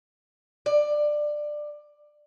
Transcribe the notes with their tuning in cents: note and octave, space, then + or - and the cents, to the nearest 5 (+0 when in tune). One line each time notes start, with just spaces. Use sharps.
D5 +15